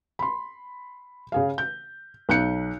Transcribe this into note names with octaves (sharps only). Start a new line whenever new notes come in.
B5 C6
C#3 G#4 F5
G6
B1 F#6 G6 C#7